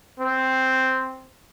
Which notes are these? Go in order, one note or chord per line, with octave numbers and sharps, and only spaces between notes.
C4